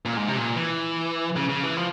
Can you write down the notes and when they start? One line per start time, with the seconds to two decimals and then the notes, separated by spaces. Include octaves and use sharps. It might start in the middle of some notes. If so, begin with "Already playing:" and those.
0.05 A#2
0.17 G#2
0.28 C3
0.37 A#2
0.56 E3
1.37 C#3
1.49 C#3
1.64 E3
1.77 F3